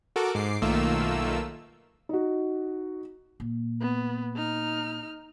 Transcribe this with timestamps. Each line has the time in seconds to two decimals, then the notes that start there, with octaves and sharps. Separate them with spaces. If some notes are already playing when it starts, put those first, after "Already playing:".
0.16 F#4 A4 A#4 D6
0.35 G#2 D6 C7
0.62 B1 D#3 A3 A#3 F4 E6
2.09 D#4 F#4
3.40 A#2
3.81 B3
4.35 D#4 F6